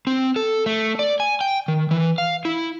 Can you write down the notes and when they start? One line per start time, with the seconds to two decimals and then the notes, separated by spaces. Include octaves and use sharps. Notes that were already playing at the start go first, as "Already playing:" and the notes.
0.07 C4
0.36 A4
0.66 A3
0.99 D5
1.20 G#5
1.41 G5
1.68 D#3
1.91 E3
2.18 F5
2.45 E4